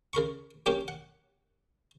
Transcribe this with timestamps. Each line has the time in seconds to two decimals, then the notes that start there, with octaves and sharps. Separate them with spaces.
0.13 C#3 A#4 B5 C#6
0.66 F#3 A#3 C#4 G4 C#5
0.88 F#5